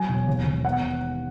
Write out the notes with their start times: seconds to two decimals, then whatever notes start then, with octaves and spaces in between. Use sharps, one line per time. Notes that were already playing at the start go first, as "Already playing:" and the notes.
Already playing: F#3 G#5
0.09 E1
0.27 D#2
0.45 D#2
0.65 B3 F#5